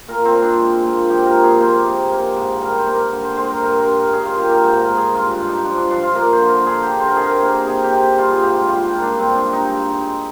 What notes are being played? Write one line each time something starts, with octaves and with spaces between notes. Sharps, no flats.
A#2 A#4
C4
A#2
D4
G#3
A#2
F3 G4
A#4
A#3
G#4
A#3 C5
C3
A#3
G#2
G3 A#4
C5
A#3
A#4
D3
C5
G#3 C5
A#4
G2 A#4
A#4
G2
A#4
D#3 G#4
F4
A#3 G4
A#4
G#2 C5
A#4
G#2
G#4
G2 F4
D4
G2
D#4
F3 D4
D4
F3 D4
F4
A#3 A#4
C5
D3
A#4
D3 G#4
G4
D3
C5
A#4
C3 G#4
A#4
A#3
C3 G#4
G4
C3
G4
G3 F4
G#4
G#2 G4
F4
G3 F4
D4
A#3
D4
G2 C4
D4
G2
D#4
G#3
G#3